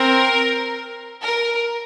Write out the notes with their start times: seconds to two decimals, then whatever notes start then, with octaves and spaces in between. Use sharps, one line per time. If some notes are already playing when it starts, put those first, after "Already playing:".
Already playing: C4 A#4
1.23 A#4